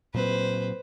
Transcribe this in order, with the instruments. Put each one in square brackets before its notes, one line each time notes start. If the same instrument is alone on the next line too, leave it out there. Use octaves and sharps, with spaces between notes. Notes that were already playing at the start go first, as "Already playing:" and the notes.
[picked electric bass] A#2 F#3 C4 [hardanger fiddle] B4 C5